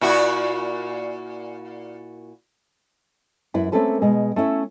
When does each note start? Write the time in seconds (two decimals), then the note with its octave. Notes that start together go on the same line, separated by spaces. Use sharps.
0.01 A#2 E4 F#4
3.54 F#2 E4 B4
3.72 A3 A#3 C4 C#4 A4 B4
4.02 B2 G#3
4.36 A3 C#4 E4 E5